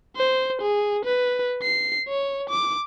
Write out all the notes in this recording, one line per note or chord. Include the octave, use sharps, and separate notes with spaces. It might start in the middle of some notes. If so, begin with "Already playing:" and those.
C5
G#4
B4
C7
C#5
D6